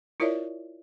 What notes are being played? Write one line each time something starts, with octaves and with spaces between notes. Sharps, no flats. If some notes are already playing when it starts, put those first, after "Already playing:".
E4 F4 A#4 C#5 D5 E5